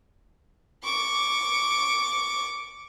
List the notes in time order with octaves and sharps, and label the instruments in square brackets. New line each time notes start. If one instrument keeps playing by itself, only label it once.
[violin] C#6 D6